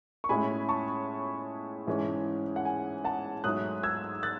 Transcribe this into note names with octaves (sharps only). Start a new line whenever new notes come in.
C#6
A2 G#3 C#4 E4 G#5 B5
A5 C#6
G#2 E3 G#3 C#4
F#5
G#5
F#5 A5
G#2 F#3 A3 D#4 D#6 F#6
E6 G#6
F#6 A6